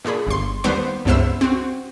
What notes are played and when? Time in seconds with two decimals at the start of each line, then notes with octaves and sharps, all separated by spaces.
0.05 A#2 D4 G#4 B5
0.27 G1 C6
0.64 D#2 G3 B3 C5
1.05 C#2 G2 B3 C5 E5 E6
1.41 C4 F#4